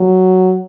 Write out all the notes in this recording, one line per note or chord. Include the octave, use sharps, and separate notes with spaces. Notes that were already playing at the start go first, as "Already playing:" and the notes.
Already playing: F#3